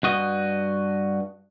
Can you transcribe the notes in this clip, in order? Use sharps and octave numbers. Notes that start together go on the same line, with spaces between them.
G2 F#4 D#5